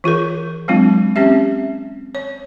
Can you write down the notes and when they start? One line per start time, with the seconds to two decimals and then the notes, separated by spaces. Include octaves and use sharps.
0.04 E3 F4 G#4 A#4
0.68 F#3 G#3 C4 D4 F4
1.16 C4 C#4 G4 E5
2.15 C#5